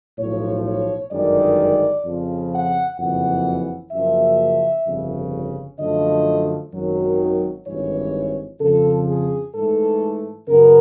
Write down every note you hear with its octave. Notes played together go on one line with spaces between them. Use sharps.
B1 A2 F3 C#5
C#5
G1 F#2 D#3 G#3 D5
F2 C#3 F3
F#5
F#1 F2 C#3 E3 F#5
F#1 F#2 C#3 F3 A#3 E5
G1 F2 C#3
F#2 D3 F3 A3 D#5
G#1 F#2 D#3 F#3
G#1 G2 E3 C#5
F2 C#3 F3 A4
G#4
G#2 E3 A3 A4
F#2 C#3 F#3 B3 A#4